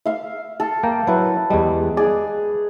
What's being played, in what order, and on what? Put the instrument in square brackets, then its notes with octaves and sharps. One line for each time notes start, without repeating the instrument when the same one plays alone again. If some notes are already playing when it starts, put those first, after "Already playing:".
[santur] E5 F5
A4
[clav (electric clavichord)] A#3 G5 A#5
[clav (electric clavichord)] F#3 E4 [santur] B4
[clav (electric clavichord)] E2 G3 [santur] G#3
[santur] G#4 [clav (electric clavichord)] D5